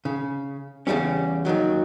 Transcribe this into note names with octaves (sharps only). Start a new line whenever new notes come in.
C#3
E2 A2 C#3 G3 C#4
D#2 A#2 D#3 F#3